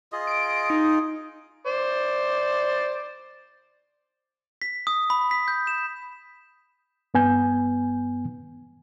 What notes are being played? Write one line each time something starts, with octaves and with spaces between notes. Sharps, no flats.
F4 G#4 D#5
D7
D#4
C5 D5
B6
D#6
B5
B6
G6
E7
G2 B3 G#5 G6